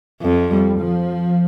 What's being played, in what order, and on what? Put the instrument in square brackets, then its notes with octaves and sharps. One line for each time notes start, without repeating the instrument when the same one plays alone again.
[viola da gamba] F2
[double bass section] G3
F3